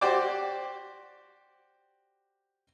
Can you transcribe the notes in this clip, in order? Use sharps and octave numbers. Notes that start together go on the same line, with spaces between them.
F#4 G4 C5 D5 G5 D6